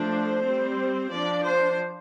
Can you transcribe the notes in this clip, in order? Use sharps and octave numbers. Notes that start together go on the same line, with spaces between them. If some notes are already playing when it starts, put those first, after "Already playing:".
Already playing: F3 A3 D4 C5
G3 C4
F3 D4 D5
C5